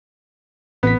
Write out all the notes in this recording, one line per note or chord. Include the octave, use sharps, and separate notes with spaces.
A1 B3 B6